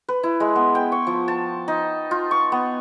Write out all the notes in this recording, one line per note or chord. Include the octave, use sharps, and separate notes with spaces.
B4
E4
G#3
B3
G5
C#6
F3
A5
D#4
F4
C#6
B3